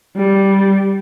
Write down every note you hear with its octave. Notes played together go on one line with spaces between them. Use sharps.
G3